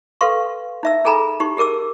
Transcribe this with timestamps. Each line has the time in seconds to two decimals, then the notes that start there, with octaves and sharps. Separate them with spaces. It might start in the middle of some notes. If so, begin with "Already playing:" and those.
0.21 A4 B4 F5 C6 C#6
0.83 D#4 E5 E6
1.05 D#4 G#4 A4 G#5 A#5 B5
1.40 D#4 G4 C#6
1.57 G4 G#4 A#4 D6 E6